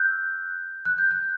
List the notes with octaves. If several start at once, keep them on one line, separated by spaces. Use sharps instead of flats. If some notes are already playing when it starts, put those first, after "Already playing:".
Already playing: E6 F#6 G6
F#6
G6
F#6